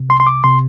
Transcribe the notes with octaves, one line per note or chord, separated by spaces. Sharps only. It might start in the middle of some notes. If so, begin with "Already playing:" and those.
Already playing: C3
C2 C6
C6
D6
C3 C6